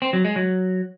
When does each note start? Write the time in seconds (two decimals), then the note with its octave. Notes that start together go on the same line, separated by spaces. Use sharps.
0.02 C4
0.13 F#3
0.25 G#3
0.36 F#3